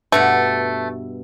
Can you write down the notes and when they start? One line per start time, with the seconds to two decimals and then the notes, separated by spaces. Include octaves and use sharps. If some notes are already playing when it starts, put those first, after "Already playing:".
0.12 G2 B2 A3 F#5